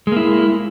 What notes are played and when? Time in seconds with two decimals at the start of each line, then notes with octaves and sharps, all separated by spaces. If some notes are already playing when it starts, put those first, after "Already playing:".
0.07 G#3
0.12 A#3
0.17 E4